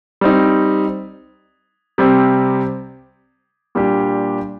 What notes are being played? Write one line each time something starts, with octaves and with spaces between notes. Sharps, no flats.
G3 C4 D#4
C3 G3 C4 G4
A#2 G3 D4 G4